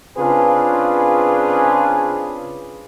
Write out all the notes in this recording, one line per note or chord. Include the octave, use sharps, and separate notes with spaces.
C#3 C4 D4 F4 G#4 B4